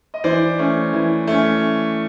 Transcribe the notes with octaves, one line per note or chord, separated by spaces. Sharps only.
D#5
E3 C5 D5
A3 C#4
E3
A3 C#4